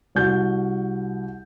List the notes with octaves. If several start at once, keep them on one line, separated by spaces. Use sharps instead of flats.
C2 F#4 G6